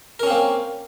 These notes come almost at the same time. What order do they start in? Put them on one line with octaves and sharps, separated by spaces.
A#4 C#4 C4 A#3